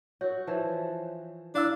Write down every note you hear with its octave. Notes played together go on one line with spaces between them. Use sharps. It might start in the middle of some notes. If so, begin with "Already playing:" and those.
F#4 A#4 C#5
E3 F3
D4 E4 D5 F5 E6